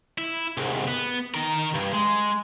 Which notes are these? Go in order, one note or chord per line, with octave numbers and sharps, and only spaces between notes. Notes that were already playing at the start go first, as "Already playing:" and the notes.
E4
C2 G#2
B3
D#3 A#4
G2
G#3